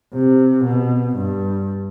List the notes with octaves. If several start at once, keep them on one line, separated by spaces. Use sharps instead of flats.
C3
B2
G2